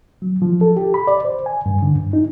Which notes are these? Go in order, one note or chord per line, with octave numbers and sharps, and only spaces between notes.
F#3
F3
A4
G4
B5
D5
C5
G#5
G2
D3
G2
D#4